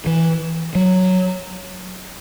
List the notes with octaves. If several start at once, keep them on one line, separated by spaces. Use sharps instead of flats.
E3
F#3